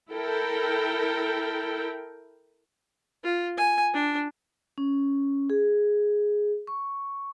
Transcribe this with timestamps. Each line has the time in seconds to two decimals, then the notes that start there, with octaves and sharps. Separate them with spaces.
0.11 E4 A4 A#4 G5
3.24 F4
3.57 G#5
3.93 D4
4.78 C#4
5.50 G#4
6.67 C#6